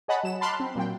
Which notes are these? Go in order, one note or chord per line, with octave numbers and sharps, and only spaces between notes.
G#4 C#5 D#5 F#5 A5 B5
F#3 E7
A5 B5 C6 D6 F6 F#6
C4
A#2 F#3 G5